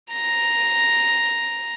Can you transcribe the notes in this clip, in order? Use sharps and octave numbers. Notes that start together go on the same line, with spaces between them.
A#5 A#6